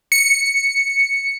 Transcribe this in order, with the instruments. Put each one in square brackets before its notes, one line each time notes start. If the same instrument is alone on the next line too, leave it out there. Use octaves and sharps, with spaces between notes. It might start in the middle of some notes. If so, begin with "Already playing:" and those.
[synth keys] C#7